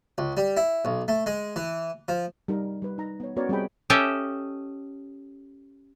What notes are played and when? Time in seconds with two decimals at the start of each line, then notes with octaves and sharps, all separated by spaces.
0.18 C#2
0.37 G3
0.57 E4
0.85 B1
1.08 A3
1.26 G#3
1.56 E3
2.08 F3
2.48 G3 D#4 A#4
2.82 G3 B4
2.98 D#4 A#5
3.20 B3 C#5
3.36 B3 C#4 F#4 A#4 C#5 D5
3.49 G3 C4 G#4 D#5 G5 B5
3.90 C#4 G4 A4 D#5 E5